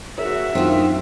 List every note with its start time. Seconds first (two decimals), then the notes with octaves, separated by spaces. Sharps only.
0.18 F#4 G#4 A#4 C#5 E5
0.55 F#2 D#3 A3 C4 D4 F4